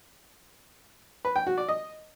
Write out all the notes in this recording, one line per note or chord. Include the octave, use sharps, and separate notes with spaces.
B4
G5
F#4
D5
D#5